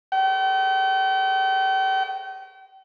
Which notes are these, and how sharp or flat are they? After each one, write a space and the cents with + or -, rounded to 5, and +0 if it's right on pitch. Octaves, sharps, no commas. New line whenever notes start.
G5 -40